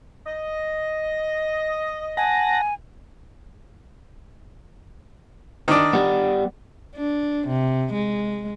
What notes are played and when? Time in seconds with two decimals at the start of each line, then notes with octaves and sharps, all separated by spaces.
0.26 D#5
2.17 F#5 G#5 A5 A#6
5.68 D#3 D4
5.93 G3 B3
6.96 D4
7.47 C3
7.93 G#3